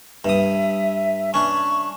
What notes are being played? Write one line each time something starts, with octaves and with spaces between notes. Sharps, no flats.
G2 E5 D#6
C#4 D4 C#6